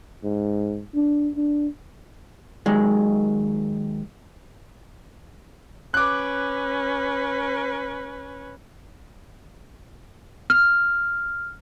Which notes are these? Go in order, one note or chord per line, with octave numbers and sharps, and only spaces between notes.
G#2
D4
D4
D#2 D#3 F#3 G#3
C#4 B4 D6 F#6
F6